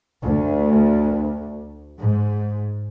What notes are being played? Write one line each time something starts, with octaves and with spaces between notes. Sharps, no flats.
D2
G#2